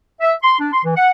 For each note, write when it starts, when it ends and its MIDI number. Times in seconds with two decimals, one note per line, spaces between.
0.21 0.33 76
0.42 0.59 84
0.59 0.69 62
0.72 0.80 84
0.84 0.93 52
0.95 1.11 78